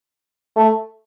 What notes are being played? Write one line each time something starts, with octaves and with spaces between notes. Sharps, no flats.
A3